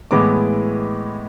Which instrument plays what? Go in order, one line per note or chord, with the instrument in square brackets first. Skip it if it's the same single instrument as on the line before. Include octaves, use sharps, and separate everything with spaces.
[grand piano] A2 E3 G#3 B3 D6